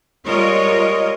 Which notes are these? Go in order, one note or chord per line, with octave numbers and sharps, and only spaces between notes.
G3 G#3 F4 A#4 C#5 D#5